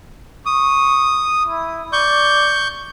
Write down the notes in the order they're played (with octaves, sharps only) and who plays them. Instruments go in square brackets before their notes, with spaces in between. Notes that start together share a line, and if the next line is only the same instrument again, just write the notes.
[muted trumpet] C#6 [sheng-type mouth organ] D#6
[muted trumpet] E4
[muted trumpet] D5 [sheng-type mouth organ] C#6 G6